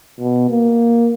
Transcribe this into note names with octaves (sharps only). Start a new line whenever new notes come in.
B2
A#3